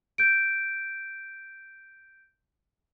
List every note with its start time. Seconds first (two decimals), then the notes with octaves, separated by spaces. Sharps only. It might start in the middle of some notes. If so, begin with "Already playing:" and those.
0.18 G6 D7